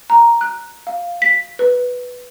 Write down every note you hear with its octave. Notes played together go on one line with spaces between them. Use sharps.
A#5
F#6
F5
B6
B4